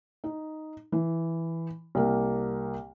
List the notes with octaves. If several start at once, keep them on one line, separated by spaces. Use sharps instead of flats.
D#4
E3
C2 A#3